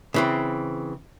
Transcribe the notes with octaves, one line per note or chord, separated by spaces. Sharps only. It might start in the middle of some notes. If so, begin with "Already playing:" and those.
C#3 E3 C4